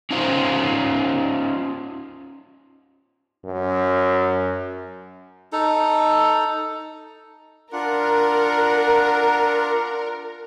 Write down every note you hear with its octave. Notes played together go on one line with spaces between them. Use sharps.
C#4 D#4 F4 C5
F#2
D#4 A4
D4 F4 A#4 F#5